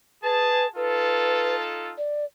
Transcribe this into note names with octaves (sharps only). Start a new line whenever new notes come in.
G#4 B4 A5
D#4 F4 A4 B4
D5